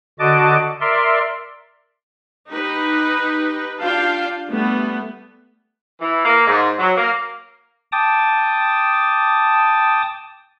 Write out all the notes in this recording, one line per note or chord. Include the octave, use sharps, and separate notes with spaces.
D3 F#4 D#5 A5 D6
A#4 D5 E5 C6
D#4 G4 B4
D4 F4 G4 F5 G5 A5
G3 A3 B3
E3
A#3
G#2
F#3
A#3
G5 A5 D6 D#6